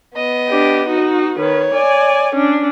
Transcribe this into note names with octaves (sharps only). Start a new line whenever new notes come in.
B3 D#5
D4 G4
D#4 F#4
D#3 B4 C#5
D5 G#5
C#4 D4